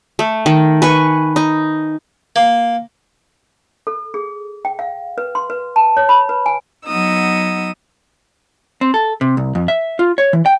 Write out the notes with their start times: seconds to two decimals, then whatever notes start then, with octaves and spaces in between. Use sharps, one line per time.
0.19 A3
0.46 D#3
0.82 B4 G#5 C#6
1.36 D#4
2.36 A#3
3.87 A4
4.14 G#4
4.65 G5
4.79 F5
5.18 B4
5.35 C6
5.50 B4
5.76 A5
5.97 C#5
6.09 B5
6.29 B4
6.46 G#5
6.86 F#3 B3 D#4 D#6 E6
8.81 C4
8.94 A4
9.21 C3
9.37 C2
9.55 F2
9.68 E5
9.99 F4
10.18 C#5
10.33 E3
10.46 G5